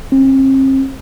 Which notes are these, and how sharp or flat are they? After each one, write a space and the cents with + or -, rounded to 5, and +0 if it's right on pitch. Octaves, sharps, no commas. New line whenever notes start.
C4 +40